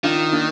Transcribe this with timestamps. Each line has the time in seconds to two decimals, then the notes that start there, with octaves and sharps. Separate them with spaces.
0.04 D#3 D4 F4
0.33 A#3 D4